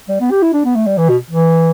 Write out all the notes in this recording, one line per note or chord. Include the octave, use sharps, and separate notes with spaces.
G3
B3
G4
E4
D4
B3
A3
G3
E3
B2
E3